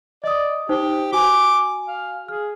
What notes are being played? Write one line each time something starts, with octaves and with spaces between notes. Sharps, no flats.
D5 D#5 D#6
D#4 G4 C5 D#6
F#4 G#5 D6
F5
G#4 F6